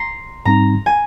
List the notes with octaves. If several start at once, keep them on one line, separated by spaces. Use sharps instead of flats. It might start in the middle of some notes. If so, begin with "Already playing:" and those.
Already playing: A#5 C6
G#2 G3 C4 D#4 A#5
G#5